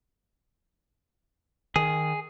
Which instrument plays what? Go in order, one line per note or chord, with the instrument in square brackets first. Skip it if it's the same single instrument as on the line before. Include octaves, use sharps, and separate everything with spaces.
[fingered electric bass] D#3 [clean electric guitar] G#4